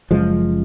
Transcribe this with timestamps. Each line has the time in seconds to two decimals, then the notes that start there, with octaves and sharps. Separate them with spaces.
0.11 F#1 F#2 C#3 F3 G#3